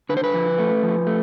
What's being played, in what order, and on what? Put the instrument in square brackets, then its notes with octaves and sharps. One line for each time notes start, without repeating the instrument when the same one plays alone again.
[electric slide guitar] D3 B4
C5
B4
F3
A3
F3
A3